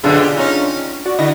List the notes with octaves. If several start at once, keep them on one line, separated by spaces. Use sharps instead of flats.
F#2 B2 D3 D4 F4 G#4
G4
C#4 D#4
F#4 D5
D3 E4 D#5 A#6